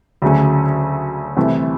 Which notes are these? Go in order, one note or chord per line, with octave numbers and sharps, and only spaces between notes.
D2 C#3 F#3 A3 C#4
C2 C3 E3 A3